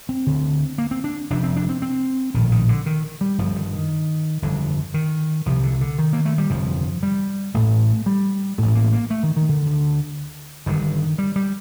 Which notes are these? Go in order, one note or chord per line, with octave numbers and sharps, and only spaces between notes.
C4
D2 D3
A#3
C4
D4
F1 F2 C3 D4
C4
D4
C4
C4
A#1 A2 D#3
D#3
D3
D#3
G3
G1 G2 D3 F3
D#3
D#3
G1 F2 D3
D#3
C2 C3 F3
D3
D3
D#3
A#3
A3
G3
G1 F2 C3 F3
G3
A1 A2 A3
G3
A1 A2 A3
A#3
A#3
A3
D#3
D#3
D3
D2 D3
G1 G2 D3 D#3
G3
G3